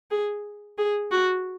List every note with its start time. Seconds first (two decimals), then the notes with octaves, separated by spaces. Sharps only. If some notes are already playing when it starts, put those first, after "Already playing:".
0.11 G#4
0.78 G#4
1.11 F#4